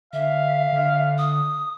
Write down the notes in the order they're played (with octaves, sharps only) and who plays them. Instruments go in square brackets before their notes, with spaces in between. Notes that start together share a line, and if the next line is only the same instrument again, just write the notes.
[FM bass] D3 [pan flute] E5 [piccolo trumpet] F5
[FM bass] D3
[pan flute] D#6